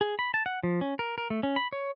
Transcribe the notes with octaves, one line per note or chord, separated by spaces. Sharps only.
G#4
B5
A5
F#5
F3
C#4
A#4
A#4
A3
C#4
B5
C#5